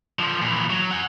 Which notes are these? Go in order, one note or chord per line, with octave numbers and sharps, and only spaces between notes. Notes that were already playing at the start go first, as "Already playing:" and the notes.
D3 F3
A#2 E3
F#3
F#5 G#5